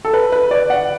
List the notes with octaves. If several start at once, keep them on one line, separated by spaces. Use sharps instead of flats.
A4
B4
B4
D5
F#5